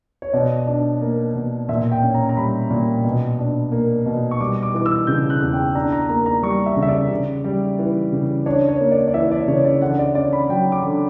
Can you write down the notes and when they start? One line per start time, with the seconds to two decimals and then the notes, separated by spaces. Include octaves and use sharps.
0.22 C#5
0.33 B2 D5
0.67 D4
1.01 A#3
1.35 B2
1.69 A#2 E5
1.92 G5
2.03 C#4
2.14 A#5
2.29 A#5
2.37 G3 B5
2.70 A#2
3.04 B2
3.39 D4
3.72 A#3
4.06 B2
4.31 C#6
4.40 G3 D6
4.63 D6
4.74 E3 D6
4.86 E6
5.07 C#3 G6
5.30 F#6
5.42 E2
5.53 G5
5.75 D4 A#5
5.92 A#5
6.09 A#3 A#5
6.26 A#5
6.43 G3 C#6
6.66 E5
6.77 C#3
6.83 E5
6.88 D5
7.10 C#3
7.44 G3
7.79 E3
8.12 C#3
8.46 D4 C#5
8.68 C#5
8.80 A#3
8.91 D5
9.08 D5
9.14 E3 E5
9.31 D5
9.48 C#3 C#5
9.65 D5
9.81 D3 F#5
9.99 D5
10.15 C#4 D5
10.33 B5
10.49 F#3 G5
10.72 D6
10.83 D3